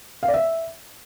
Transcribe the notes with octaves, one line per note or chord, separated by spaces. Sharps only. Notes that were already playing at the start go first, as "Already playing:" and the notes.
F5
D5
E5